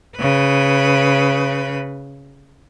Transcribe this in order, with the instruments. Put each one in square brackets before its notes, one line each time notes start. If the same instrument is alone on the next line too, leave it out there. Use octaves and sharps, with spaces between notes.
[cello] C#3 B4